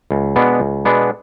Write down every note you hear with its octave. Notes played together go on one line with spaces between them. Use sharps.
C#2
B2 G#3 B3 D4
C#2
B2 G#3 B3 D4